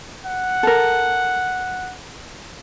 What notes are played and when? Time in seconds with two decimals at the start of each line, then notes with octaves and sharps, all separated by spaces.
0.25 F#5
0.63 A4 A#4